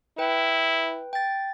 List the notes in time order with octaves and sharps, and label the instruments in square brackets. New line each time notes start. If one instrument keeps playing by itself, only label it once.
[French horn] E4 [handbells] B4 G5
[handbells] G5 A6